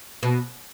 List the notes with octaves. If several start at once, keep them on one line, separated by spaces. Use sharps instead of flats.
B2